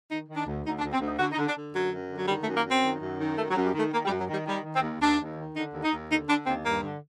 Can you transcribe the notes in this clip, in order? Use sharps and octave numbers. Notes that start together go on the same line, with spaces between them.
D#3 D#4
D#3
D4
D2
D2 D#4
D4
D2
C4
D2
D#4
D3 F#4
D#4
D3
D4
D3
F#2 F#3
F#2
D3
F#3
D#3 G3
A3
F#2
A#3
F#2
C4
D#3
F#2
D#3
F#2 A3
F#3
F#2
G3
D#3 A3
D#3 A#3
G3
F#2
F#3
D#3 G3
D#3 G3
D#3
C4
D#2
D#2 D4
D#2
D#3
D3 D#4
D#2
D#4
D#2
D3 D#4
D3 D4
D#2 C4
G2 A#3
D3